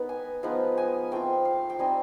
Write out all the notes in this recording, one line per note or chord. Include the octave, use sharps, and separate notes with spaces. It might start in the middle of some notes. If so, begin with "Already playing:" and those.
Already playing: B3 D#4
G#5
F3 G#3 B3 D#4
G#5
A3 C4 F4 G5
F5
G5
G3 C4 D#4 G#5